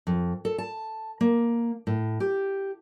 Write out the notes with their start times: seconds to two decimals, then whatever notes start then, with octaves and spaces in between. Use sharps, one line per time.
0.07 F2
0.45 A4
0.58 A5
1.21 A#3
1.87 A2
2.20 G4